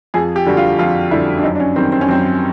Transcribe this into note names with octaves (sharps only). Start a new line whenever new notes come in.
F2 G#4
G4
D3 G3 F#4
F4
F2 F4
D3 G3 E4
D4
F#2 D#4
D4
C#4
D#3 G3 C4
C4
C#4
F#2 C4